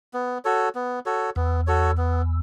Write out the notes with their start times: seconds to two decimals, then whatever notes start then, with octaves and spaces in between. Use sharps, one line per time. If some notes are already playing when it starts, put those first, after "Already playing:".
0.14 B3
0.45 F#4 A4 C#5
0.75 B3
1.06 F#4 A4 C#5
1.36 E2 B3
1.67 F#4 A4 C#5
1.97 B3